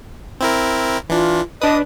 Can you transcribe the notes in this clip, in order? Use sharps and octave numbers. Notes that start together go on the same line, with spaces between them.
C4 E4 A#4
E3 D4 F4
D4 B4 D#5 D#6